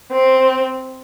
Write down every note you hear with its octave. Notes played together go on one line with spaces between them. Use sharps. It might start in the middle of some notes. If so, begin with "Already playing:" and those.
C4